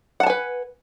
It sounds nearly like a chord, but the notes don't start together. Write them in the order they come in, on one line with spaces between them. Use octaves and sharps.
F#5 A5 G#5 B4